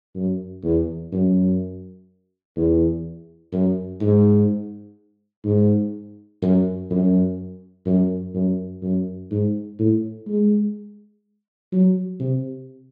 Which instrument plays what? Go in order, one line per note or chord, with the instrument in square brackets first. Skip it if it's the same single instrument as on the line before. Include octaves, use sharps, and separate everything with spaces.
[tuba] F#2
E2
F#2
E2
F#2
G#2
G#2
F#2
F#2
F#2
F#2
F#2
G#2
A2
G#3
F#3
C3